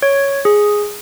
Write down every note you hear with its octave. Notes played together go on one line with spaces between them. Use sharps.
C#5
G#4